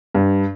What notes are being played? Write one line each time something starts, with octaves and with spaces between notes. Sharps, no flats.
G2